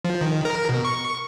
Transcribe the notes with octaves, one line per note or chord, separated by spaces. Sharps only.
F3
D#3
A#4
B2
C#6